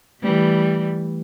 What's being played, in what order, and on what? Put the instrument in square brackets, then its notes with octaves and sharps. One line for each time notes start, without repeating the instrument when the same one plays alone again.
[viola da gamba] E3 G3 A3